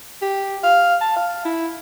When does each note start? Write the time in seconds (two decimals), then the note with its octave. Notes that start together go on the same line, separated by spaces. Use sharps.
0.22 G4
0.63 F5
1.01 A5
1.16 F5
1.45 E4